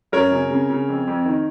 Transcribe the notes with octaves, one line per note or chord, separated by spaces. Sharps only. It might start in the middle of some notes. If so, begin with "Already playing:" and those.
F#2 A#4 C#5
C#3
C#3
C#3
F2
F2
D#3